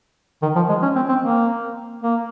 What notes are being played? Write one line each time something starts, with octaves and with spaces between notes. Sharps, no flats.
D#3
F3
G#3
C#4
C4
C4
A#3
A#3